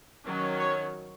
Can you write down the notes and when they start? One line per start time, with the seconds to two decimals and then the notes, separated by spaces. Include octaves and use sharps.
0.25 D#3 F#3 C#4
0.59 C#5